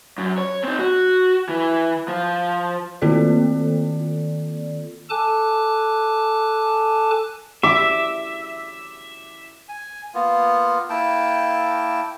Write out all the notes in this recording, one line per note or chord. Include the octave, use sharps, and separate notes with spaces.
F#2
C#5
C4 D#4
F#4
E3
F3
D#3 A#3 C4 F4 A4 D5
A4 G#5 A5 D6 F#6
E5 D6
G#5
A#3 B3 F4
A#3 E4 G5 A5